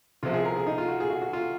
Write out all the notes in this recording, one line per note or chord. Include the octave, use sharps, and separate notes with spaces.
C2 C3 F3 F4
G#4
A#4
G#4
D#4
F4
F#4
G#4
F#4
F#4
F4